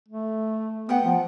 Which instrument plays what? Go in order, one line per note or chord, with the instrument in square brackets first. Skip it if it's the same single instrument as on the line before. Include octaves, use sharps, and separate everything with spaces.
[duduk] A3
[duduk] B3 [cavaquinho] F#5 G5 D#6
[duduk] F3